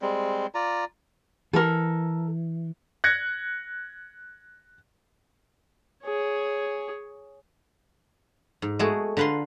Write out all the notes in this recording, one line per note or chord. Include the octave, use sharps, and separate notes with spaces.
G3 G#3 C4
F4 D5 A#5
E3 A4 A#4
F#6 G#6 A#6 C#7
G#4 C#5
G#2
G#3 A3 B3 F#4 G#4
D3 F4 B4 A#5 C6